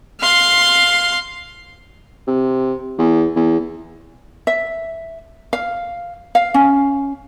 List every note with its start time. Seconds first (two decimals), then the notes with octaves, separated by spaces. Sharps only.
0.21 F5 C6
2.27 C3
2.99 E2
3.36 E2
4.47 E5
5.53 F5
6.35 F5
6.54 C#4